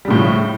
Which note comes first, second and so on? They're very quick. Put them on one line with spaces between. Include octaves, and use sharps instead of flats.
G3 C#3 A2 F3